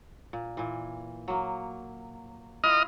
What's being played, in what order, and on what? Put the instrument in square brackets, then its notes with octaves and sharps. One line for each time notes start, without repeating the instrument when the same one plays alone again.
[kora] A#2
A#2 E3
F#3 A#3
[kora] E4 F4 [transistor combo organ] D#5 D#6 F6